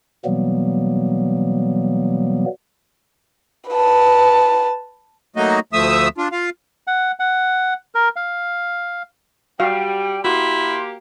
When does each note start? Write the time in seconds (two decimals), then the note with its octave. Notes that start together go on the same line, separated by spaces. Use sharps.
0.25 B2 E3 F#3 G3 A#3 B3
3.69 B4 A5
5.36 F#3 A3 A#3 D#4 F#4 D#5
5.73 D2 F3 A3 E5 D#6 E6
6.18 D4 F4
6.32 F4 F5
6.87 F#5
7.20 F#5
7.95 A#4
8.16 F5
9.60 G3 F#4 F5 G5
10.24 A#3 E4 F#4 G4 C6